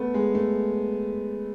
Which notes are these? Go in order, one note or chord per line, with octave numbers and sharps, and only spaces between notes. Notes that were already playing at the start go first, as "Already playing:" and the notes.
Already playing: A3 B3
G#3
A3